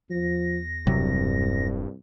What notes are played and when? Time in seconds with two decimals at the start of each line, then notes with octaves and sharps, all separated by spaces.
0.10 E2 F3 A#6
0.87 E1 C2 G2 C3 F#3